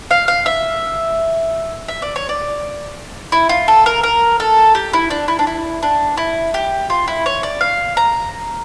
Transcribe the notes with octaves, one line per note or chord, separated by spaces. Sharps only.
F5
F5
E5
E5
D5
C#5
D5
E4
F4
A4
A#4
A#4
A4
G4
E4
D4
E4
D4
E4
D4
E4
G4
F4
E4
C#5
D5
F5
A#5